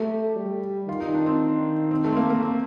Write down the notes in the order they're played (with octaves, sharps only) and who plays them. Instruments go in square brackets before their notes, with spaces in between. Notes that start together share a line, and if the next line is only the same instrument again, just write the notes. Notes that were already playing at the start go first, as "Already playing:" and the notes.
Already playing: [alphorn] A3 [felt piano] G4
[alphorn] G3
[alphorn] D#3 [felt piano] F4
[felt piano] D#4
D4
C4
C4
A3
C4
A#3
A#3
C4